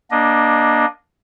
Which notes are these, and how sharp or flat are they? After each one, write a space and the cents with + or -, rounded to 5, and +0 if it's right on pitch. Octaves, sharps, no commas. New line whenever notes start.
A#3 +25 D4 +0 D#5 +0